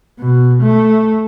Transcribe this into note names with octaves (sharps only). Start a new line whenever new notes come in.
B2
A3